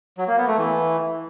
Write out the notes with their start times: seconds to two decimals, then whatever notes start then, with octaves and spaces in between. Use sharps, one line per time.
0.18 F#3
0.28 A#3
0.38 B3
0.48 A3
0.58 E3